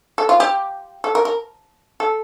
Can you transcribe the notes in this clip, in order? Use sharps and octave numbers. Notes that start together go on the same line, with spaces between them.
A4
F4
G4
A4
A#4
A#4
A4